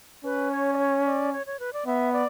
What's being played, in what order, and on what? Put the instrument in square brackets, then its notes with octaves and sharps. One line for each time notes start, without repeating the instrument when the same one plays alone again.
[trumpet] C#4 [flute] B4
[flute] C#5
D5
C#5
D5
C#5
C#5
B4
D5
[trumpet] B3 [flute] E5
[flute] D5